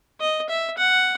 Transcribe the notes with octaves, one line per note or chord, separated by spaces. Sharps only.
D#5
E5
F#5